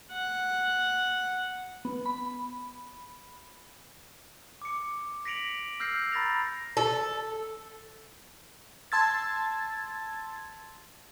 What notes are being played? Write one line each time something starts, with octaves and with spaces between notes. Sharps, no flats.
F#5
B3
B5
D6 C#7
A#6 B6 C#7 D7 F7 F#7
E6 F6 G6 A#6 C7
A#5 B5 A6 A#6 F7
A4
A5 C6 E6 G#6 A6